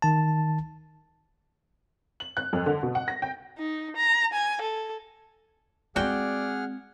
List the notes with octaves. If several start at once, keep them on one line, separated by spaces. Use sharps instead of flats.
D#3 A5
F#7
F#6
F2
D3
B2
F#5
A#6
G5
D#4
A#5
G#5
A4
G#3 C4 F#4 G#4 D5 F#5 G5 F6